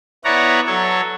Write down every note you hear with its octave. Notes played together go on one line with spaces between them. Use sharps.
B3 E4 C#5 D5 F#5 A#5
F#3 A4 C#5